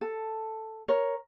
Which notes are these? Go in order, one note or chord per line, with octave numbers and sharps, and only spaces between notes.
A4
A#4 C#5